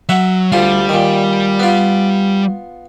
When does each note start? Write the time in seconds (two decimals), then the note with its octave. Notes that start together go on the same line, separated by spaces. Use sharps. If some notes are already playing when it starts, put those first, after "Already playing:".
0.09 F#3 E5 F#5
0.52 D2 G3 F4
0.89 A#2 D#3
1.59 B3 F4